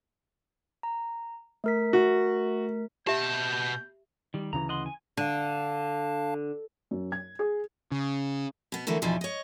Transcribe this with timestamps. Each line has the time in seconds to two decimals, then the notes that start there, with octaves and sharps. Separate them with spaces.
0.83 A#5
1.64 A3 A#4 B6
1.93 F#4
3.07 B2 G4 E5 A5 G6
4.34 D#3 G3
4.53 D2 C#3 E3 A#5
4.69 D#5 F#5 C6
4.86 G#5
5.17 D3 F5 A5
6.91 F#2
7.12 G#6
7.39 G#4
7.92 C#3
8.72 B2 B3
8.87 D3 E3 A3 A#3
9.02 E2 B2 E3 F3 D#4
9.21 C#5 D#5